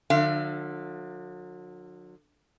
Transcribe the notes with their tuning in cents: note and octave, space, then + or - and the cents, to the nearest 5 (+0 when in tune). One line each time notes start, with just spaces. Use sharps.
D3 +35 F#3 -35 F5 -45